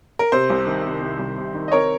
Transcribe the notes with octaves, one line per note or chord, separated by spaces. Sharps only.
A#4
C3 C5
C2
D#3
C3
C3
C2
C3
D#3
D#5
C4 A#4 C#5